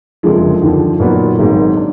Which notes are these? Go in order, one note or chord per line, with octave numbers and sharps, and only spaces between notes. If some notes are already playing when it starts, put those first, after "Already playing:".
F#1 F2 D3 F3 G#3
D#2 D3 F3
A#2 F#3 B3 D#4 F#4
G#1 G#2 F#3 A#3
D4